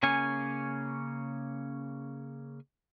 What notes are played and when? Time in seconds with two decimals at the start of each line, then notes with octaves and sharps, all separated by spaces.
0.03 C#3 A#3 C#4 C#5 G#5